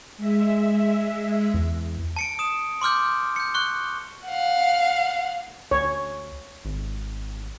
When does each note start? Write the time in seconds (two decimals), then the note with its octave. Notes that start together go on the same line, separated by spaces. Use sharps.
0.17 G#3 E5
1.54 E2
2.16 A5 C#7 D7
2.39 D#6 E7
2.82 C6 D6 F6 G6
3.36 G6 C#7
3.54 C#6 F#6 G7
4.26 F5 F#5
5.71 D2 C#5
6.65 G#1